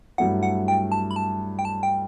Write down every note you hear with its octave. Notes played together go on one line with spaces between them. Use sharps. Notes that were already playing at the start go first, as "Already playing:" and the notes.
G2 F#3 A3 E4 F#5
F#5
G5
A5
B5
A5
G5
A5
G5